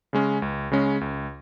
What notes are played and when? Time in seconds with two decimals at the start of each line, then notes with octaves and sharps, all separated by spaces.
0.13 C#3 G#3 C#4
0.42 C#2
0.71 C#3 G#3 C#4
1.01 C#2